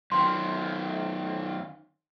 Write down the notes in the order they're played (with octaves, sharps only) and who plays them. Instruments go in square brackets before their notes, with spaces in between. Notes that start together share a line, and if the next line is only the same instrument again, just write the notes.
[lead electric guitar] F#2 D#3 [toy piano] C6